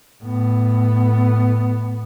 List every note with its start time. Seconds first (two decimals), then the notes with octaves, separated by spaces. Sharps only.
0.24 A2 B3